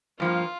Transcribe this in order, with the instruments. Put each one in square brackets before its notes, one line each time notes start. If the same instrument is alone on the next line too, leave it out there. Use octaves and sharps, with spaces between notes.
[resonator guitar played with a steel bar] G2 F3 A#3 [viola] F4